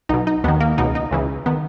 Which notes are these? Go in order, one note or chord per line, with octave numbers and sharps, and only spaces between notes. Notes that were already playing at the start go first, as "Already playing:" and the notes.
B1 B2 D#4
D#4
D#2 D#3 B3
A#3
C#2 B2 D#4
D#4
C#2 C#3 E3
D#3 B3